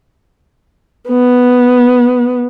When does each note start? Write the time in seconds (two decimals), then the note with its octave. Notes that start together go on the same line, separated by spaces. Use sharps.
1.08 B3